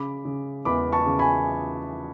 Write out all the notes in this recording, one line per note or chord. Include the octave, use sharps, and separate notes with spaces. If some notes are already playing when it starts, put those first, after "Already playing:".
Already playing: C#3 B5 D6
C#3
E2 B5 D6
A5 C#6
C#3
G#5 B5